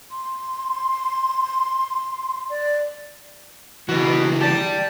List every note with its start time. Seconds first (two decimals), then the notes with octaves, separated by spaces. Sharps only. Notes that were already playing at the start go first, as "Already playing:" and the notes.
0.11 C6
2.49 D5
3.89 C#2 E3 F#4 B4
4.41 G4 D5 A5